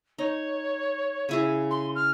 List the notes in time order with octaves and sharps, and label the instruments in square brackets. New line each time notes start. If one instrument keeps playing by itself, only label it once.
[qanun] D#4 [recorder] C#5
[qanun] C#3 E4 G#4
[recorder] C6
F6